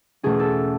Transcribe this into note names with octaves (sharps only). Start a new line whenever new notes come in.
E2 B2 A3 C#4 G#4
A4